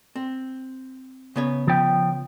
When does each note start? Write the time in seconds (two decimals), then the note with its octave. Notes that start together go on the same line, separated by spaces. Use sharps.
0.16 C4
1.36 C#3 B3 C#5
1.67 F3 G5